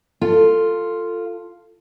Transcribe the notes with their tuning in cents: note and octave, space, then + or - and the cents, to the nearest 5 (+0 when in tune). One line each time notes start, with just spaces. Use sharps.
F4 +0 A4 +15